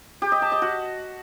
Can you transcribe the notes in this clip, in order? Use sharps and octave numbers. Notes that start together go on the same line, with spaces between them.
G4
D#5
A5
D#5
F#4